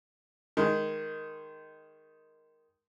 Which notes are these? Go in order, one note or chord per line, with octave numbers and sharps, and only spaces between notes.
D#3 G#3